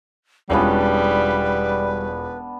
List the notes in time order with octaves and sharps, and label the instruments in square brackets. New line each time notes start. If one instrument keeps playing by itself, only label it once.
[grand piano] E1 C#4 F4 [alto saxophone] G3 [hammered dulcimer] B3 D4 G5 [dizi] B4